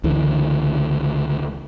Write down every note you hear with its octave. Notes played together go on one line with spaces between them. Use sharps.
C#2 D3 E3